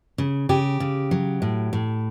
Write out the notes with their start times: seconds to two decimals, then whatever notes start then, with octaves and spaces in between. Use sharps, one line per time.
0.18 C#3
0.49 C#3 G4
0.80 C#3
1.11 F#3
1.42 A2
1.73 A2